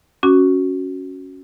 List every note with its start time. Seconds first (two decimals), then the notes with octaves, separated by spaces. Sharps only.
0.23 C#4 F#4 D6